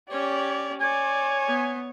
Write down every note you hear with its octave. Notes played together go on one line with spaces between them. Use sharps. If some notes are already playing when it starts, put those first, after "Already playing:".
C#4 G4 C#5 D5
C#5 D5 G#5
B3